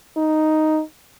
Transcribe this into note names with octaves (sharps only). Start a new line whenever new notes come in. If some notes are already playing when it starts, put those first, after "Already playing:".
D#4